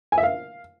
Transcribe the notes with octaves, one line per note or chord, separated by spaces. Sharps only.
G#5
E5
F5